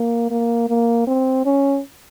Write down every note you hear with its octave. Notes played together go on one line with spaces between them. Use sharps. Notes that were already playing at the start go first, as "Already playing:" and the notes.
Already playing: A#3
A#3
A#3
C4
C#4